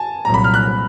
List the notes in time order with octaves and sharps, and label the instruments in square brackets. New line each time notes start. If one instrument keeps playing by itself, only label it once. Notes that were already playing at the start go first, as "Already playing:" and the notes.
Already playing: [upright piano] G#5 A5
[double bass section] C2 A#2 F#3 [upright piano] A#5
[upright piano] B5
F6
F#6